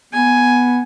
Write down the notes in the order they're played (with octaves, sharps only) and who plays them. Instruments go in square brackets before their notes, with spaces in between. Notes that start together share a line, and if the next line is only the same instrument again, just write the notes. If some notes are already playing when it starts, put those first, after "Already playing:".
[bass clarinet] B3 [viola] G#5